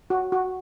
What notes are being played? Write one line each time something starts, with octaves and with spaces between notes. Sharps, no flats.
F#4
F#4